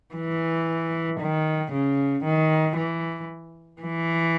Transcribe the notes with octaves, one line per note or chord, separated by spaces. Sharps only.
E3
D#3
C#3
D#3
E3
E3